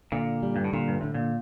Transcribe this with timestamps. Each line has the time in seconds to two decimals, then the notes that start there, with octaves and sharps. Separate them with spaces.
0.12 A#2 D3
0.43 G3
0.56 G2
0.64 A2
0.73 A#2 D3
0.88 G2
1.01 A2 D3
1.14 A#2